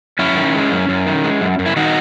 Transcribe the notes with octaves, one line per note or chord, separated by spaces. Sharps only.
F#2 C#4 E4
D#3
G#3
F#2
F#2
D#3
G#3
F#2
F#2
E4
D#3 D#4 F#4